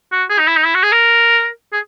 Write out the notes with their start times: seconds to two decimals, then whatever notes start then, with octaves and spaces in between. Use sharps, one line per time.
0.12 F#4
0.30 G#4
0.38 D#4
0.47 E4
0.57 D#4
0.65 E4
0.74 F#4
0.83 G#4
0.92 A#4
1.73 G#4